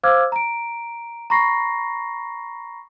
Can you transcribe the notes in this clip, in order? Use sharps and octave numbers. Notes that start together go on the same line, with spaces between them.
C5 F5 D6 E6 F6 G#6
A#5 D7
A#5 B5 C#6 A#6 C7